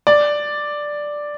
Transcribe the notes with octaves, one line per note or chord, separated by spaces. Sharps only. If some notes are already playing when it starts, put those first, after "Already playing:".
D5